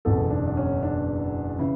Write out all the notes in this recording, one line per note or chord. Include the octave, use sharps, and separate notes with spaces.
F#1 E2 B2 A4
D4
D4
C#4
D4
C#3 E3 E4